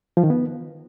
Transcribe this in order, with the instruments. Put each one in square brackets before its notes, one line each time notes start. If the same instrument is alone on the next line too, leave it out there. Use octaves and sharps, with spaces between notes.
[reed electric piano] F3
D#3
B3